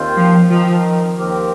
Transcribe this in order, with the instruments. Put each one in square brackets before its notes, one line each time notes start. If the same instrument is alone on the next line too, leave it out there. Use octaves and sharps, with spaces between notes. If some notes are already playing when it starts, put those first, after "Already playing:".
Already playing: [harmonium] D#2 D#3 C4 F4 C5
[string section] F3
[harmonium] D#3 C4 D#4 A#4 [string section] F3
[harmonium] D#2 D#3 C4 G4 A#4